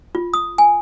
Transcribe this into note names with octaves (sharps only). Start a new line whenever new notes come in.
F4
D#6
G#5